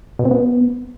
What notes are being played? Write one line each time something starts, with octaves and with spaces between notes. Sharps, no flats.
B2
C4
B3